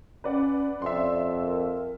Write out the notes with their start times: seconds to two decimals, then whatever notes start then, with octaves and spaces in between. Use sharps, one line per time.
0.24 C#4 B4 D5 F#5
0.82 F2 D5 E5 C6
1.42 A#4